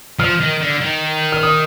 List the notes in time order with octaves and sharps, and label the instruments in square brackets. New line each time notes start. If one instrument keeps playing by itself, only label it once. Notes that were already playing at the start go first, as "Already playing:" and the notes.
[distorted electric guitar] F3 [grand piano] F6
[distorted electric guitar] D#3
D3
D#3
[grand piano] F6
D#6